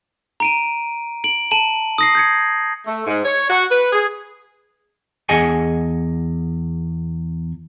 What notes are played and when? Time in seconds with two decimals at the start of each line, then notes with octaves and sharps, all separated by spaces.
0.40 A#5 D7 D#7
1.24 D7 F#7
1.51 A5 D#7 F#7
1.98 D#6 A#6 C7
2.15 G6 G#6 C#7
2.87 A3
3.07 G#2
3.24 C#5
3.50 F#4
3.71 B4
3.93 G#4
5.29 E2 G#4 D#5 F#5 G#5